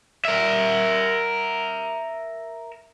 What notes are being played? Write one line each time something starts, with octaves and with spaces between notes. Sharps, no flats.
A#4 E5